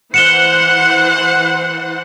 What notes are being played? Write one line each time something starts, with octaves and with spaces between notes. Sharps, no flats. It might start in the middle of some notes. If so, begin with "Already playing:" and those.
E3 C5 F#5 C#7 E7 G7